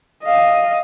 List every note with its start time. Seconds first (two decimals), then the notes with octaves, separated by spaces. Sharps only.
0.24 D#5 F5